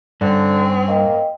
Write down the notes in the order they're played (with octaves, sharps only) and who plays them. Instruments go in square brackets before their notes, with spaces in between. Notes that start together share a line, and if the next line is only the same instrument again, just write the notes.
[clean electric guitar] G2 [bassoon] D3 [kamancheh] C4 C#4
[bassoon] A#3 [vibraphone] D#5 G5